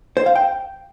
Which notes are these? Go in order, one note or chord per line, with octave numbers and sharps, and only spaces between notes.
C5
F5
G5